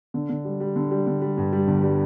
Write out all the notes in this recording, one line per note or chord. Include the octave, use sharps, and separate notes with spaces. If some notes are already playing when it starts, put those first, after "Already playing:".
D3
D3
G3
G3
D3
G3
D3
G3
G2
G3
G1
G3